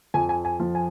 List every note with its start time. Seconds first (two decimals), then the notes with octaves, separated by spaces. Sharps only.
0.14 F2 G#5
0.29 G#5
0.45 G#5
0.60 F3
0.75 G#5